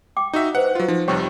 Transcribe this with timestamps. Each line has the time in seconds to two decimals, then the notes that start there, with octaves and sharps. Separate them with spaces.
0.17 G5 D6
0.33 D#4 F#4 E5
0.55 B4 C5 F#5
0.75 F#3 F4
0.88 F3 D#4
1.08 F2 C3 G3 C#5 G5 C#6